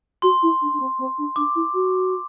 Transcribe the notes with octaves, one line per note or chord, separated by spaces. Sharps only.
F#4 C6
E4
D4
D4
C4
C4
D4
D4 D6
E4
F#4